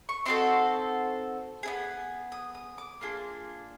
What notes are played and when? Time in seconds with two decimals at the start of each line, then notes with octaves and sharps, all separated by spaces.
0.09 C#6
0.26 C4 D#4 F#4 A4 C6
1.63 B3 E4 G#4
2.32 D#6
2.55 D#6
2.78 D6
3.01 A#3 D4 F4 G#4